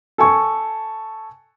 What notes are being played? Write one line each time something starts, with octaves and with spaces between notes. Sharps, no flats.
A4 G#5 C#6